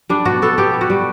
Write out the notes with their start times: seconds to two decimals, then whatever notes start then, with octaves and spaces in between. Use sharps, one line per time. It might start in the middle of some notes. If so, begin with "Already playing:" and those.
0.09 G3 D4
0.25 B2 F#4
0.42 B3 A4
0.58 B3 G4
0.74 B3
0.81 F#4
0.90 G3